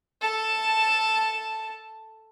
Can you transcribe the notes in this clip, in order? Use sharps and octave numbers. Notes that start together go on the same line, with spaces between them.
A4 A5